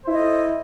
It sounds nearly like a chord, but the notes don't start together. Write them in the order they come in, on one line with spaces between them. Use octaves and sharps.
C5 E4 D#5 A4